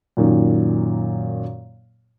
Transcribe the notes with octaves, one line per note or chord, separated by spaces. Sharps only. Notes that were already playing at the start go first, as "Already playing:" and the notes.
F#2 A#2 D#3